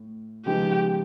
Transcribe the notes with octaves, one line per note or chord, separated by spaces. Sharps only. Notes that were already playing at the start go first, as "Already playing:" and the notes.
Already playing: A2
C#3 F3 G#3 B3 D#4 G4